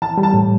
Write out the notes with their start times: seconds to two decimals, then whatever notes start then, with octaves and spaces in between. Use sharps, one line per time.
0.02 E3 A5
0.18 G3
0.23 A5
0.34 A2